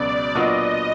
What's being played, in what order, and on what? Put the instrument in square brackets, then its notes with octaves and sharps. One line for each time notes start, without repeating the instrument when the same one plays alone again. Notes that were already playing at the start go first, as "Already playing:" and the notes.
Already playing: [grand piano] C#2 B2 F#3 B3 [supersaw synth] D5
[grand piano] A#2 F#3 B3 D4 F4 [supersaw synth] D#5